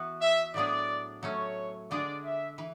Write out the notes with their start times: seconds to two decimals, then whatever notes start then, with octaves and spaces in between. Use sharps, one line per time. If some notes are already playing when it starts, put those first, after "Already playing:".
Already playing: E3 B3 F#4 B4
0.21 E5
0.54 A2 F#3 B3 D4 G#4 D5
1.23 F#3 A3 C#4 C#5
1.91 D3 G#3 D4 G#4 D5
2.25 E5
2.58 E3 B4